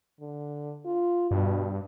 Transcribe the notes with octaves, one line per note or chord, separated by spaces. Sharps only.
D3
F4
G2 B2